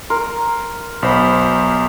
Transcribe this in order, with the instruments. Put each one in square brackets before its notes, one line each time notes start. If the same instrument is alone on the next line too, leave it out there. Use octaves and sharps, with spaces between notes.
[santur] A#4 [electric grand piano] C6
[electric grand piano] B1 C5 B5